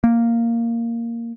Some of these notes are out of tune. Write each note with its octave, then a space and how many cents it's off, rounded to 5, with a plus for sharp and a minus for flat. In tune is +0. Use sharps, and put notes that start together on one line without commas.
A#3 -5